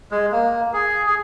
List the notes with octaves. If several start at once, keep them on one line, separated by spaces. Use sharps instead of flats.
G#3
A#3
G#4
G#4